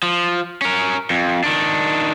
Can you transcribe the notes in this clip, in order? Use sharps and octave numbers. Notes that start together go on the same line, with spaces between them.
F3
C#4 A#4
F2
D#3 D4